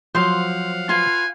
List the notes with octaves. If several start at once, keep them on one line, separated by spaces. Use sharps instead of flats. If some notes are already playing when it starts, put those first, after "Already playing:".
F3 F#3 C5 F5 F#5 C6
F4 B4 G#5